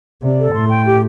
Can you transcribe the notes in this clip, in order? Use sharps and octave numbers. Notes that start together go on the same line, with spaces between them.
C3 D5
A4
A2 C6
G5
G4